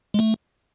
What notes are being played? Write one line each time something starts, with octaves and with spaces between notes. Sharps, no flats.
G#3
A3